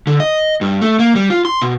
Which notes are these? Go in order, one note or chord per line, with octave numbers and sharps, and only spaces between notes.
D3
D#5
G2
A3
A#3
G3
F4
C6
B2